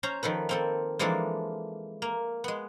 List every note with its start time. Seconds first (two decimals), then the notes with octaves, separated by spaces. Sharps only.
0.03 C#4 C5 A#5
0.23 D#3 F3 A4 B4
0.49 A#3 C4 A4
0.99 E3 F3 G#3 A#3 D4 A4
2.02 A#3
2.44 G#3 B3